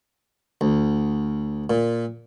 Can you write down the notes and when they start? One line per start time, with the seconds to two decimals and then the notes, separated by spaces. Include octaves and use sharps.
0.61 D2
1.70 A#2